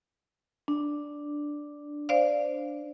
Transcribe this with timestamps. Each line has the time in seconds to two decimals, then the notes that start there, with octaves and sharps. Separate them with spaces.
0.68 D4
2.09 C5 D5 F5